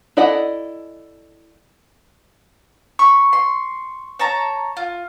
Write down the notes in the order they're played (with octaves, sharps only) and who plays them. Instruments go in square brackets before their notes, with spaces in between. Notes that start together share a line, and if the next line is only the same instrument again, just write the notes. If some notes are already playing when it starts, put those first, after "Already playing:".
[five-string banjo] E4 A4 D5 D#5 F#5
[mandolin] B5 [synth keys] C#6
[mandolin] C6
C#5 A5 A#5
F4